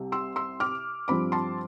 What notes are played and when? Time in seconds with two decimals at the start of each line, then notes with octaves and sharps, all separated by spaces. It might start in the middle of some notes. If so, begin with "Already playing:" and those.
Already playing: C2 C3
0.12 C6 E6
0.36 C6 E6
0.60 D6 F6
1.08 G2 F3 C4 B5 D6
1.32 A5 C6